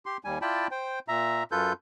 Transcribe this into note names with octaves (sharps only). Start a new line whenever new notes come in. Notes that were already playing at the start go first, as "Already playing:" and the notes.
G4 C6
D#2 G3 G#5
E4 F4 D5 G5 A5 B5
C5 G5
A#2 E5 A#5
F#2 F4 A4 B4 G6